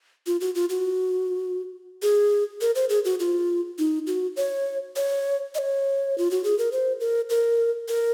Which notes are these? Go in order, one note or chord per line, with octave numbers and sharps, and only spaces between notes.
F4
F#4
F4
F#4
G#4
A#4
C5
G#4
F#4
F4
D#4
F#4
C#5
C#5
D#5
C#5
F4
F#4
G#4
A#4
C5
A#4
A#4
A#4